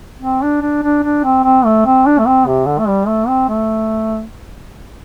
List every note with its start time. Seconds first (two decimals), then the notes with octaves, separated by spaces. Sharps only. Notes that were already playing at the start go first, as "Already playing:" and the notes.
0.22 C4
0.42 D4
0.62 D4
0.83 D4
1.03 D4
1.24 C4
1.44 C4
1.65 A3
1.86 C4
2.06 D4
2.18 A3
2.26 C4
2.47 C3
2.66 D3
2.79 A3
2.87 G3
3.07 A3
3.28 C4
3.49 A3